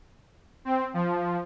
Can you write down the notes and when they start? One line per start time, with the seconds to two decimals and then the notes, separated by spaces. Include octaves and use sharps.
0.65 C4
0.94 F3